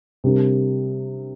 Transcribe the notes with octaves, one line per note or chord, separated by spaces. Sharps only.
C3 G3 D4 G4 A#4